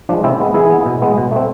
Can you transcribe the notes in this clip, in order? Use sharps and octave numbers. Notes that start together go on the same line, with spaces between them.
F3 G#3 D4
C3 C4 E4
G#3 B3
E3 E4 G#4
B3
B2
G#3 B3
B2
A3 C4